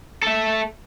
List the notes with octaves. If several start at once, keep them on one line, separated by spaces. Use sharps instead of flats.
A4 E5